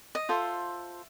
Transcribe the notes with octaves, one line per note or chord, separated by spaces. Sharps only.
D#5
F4 A4 C5 E5